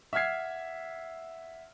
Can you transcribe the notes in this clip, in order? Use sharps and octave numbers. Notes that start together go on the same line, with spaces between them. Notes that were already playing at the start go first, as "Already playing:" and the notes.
E5 F#5 F6 G#6 C7